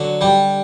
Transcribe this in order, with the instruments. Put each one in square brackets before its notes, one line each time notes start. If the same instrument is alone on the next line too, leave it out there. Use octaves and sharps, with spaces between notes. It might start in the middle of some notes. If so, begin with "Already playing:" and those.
Already playing: [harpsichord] D3 F#3 [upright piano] F#4
[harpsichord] G3 [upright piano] G4 G5